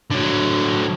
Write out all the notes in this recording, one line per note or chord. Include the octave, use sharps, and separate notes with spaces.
D3 F#3